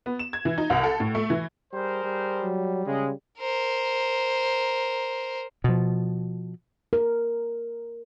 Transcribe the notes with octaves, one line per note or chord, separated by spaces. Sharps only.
B3
E7
G#6
E3
D#4
C2
A4
A2
A3
E3
G3 G#4 A#4 C5
G3
F#3
C#3 G#3
A#4 C5
B2 F3
A#4